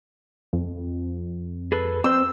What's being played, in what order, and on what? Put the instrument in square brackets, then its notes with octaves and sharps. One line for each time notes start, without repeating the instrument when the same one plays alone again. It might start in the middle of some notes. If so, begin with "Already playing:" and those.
[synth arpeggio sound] F2
[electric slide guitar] G#4 A4 B4
[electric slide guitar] C4 C5 [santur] E6